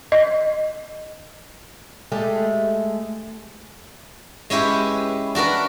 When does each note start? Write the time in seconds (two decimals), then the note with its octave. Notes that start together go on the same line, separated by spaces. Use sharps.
0.12 D#5
2.12 G#3 A3 G4
4.50 G#3 C#4 E4 G4 B4
5.35 D4 F#4 A#4 B4